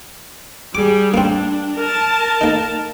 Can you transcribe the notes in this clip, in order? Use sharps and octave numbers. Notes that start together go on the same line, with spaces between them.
G3 G#4 D6
A#3 C4 D4
A#4 A5
A#3 D#4